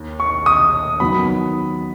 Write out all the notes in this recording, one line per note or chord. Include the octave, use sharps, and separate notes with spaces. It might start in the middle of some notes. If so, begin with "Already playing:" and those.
Already playing: D#2
C#6
D#6
D#3 F#3 B3 B5